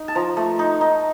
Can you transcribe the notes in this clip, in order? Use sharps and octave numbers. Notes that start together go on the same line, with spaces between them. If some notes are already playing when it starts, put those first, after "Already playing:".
Already playing: D#4
A5
F3 A#5
A3
D#4
D#4